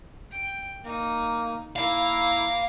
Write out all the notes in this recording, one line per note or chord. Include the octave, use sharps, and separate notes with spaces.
G5
A#3 D#4
A#3 E4 F5 A#5